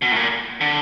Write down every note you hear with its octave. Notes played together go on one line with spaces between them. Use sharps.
B2
A2
A#2
D3